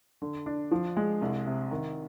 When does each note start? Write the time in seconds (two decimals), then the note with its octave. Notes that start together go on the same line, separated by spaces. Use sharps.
0.22 D3
0.46 D4
0.71 F3
0.96 G#3
1.21 C2
1.46 C3
1.71 D#3